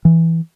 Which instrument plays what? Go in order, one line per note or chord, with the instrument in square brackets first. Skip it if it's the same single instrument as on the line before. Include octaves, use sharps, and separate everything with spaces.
[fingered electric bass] E3